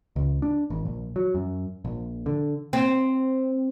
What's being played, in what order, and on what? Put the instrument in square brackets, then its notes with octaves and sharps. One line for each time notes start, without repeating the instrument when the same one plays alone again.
[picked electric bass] C#2
D4
G#1
A#1
F#3
F#2
A#1
D3
[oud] C4